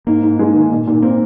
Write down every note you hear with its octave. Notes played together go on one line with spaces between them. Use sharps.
G#2 A#3
G#2
G#3
D#3
A#2
A#2
A#3 C4